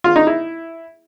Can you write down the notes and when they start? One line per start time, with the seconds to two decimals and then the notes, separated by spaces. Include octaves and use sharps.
0.04 F4
0.16 D#4
0.27 E4